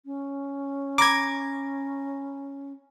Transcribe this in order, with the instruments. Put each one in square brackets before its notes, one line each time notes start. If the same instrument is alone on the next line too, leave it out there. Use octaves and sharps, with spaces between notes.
[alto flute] C#4
[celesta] A#5 B5 A#6 [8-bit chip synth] D6 G#6